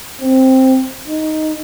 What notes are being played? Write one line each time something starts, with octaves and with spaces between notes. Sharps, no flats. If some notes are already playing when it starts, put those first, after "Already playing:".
C4
D#4